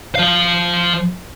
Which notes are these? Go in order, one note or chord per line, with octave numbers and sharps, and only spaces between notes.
F3 F5